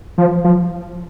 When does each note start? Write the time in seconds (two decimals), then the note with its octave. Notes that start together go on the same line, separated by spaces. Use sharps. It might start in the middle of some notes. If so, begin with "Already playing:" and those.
0.18 F3
0.44 F3